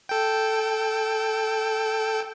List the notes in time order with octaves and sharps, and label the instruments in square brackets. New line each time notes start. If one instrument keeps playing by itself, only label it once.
[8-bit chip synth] A4 G5